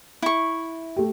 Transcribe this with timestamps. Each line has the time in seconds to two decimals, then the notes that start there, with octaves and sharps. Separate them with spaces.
0.22 E4 C#6
0.96 A3 G4